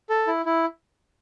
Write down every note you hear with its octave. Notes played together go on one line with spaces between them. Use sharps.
A4
E4
E4